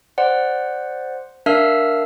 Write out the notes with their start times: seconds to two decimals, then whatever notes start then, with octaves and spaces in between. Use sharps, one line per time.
0.18 C5 D5 F#5
1.46 D4 A#4 E5 F5 E6 F6